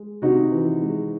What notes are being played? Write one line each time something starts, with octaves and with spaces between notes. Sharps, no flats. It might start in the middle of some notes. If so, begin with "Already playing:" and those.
Already playing: G#3
C3 D#4 F#4
E3
G#3